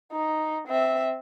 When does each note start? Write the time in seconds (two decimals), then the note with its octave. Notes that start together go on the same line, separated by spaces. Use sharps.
0.12 D#4
0.68 C4 E5